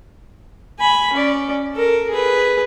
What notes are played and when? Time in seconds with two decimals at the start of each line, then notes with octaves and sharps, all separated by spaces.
0.79 G#5 B5
1.13 C#4 D5
1.75 A4 A#4
2.09 G#4 B4